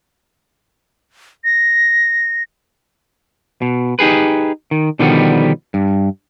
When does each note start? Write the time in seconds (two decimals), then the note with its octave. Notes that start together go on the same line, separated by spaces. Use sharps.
1.44 A#6
3.62 B2
3.99 D#4 G4 G#4 B4
4.71 D#3
4.99 B2 D3 D#3 F3 G3 B3
5.74 G2